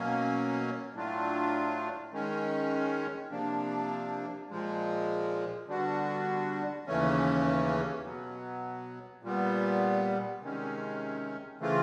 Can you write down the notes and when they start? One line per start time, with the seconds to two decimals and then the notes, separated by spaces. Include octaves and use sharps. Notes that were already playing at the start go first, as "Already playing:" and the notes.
Already playing: B2 F#3 A#3 C#4
0.94 A2 F#3 A3 D4 F4
2.12 D#3 G#3 C#4
3.31 C3 F3 A#3 D4
4.50 A#2 F3 G#3
5.68 D3 G3 B3 D4 F#4
6.86 D#2 C#3 E3 A3 C#4
8.05 B2 F#3 B3
9.23 A#2 G3 B3
10.41 C3 D#3 G#3 C#4
11.60 C#3 E3 A3 C4 F4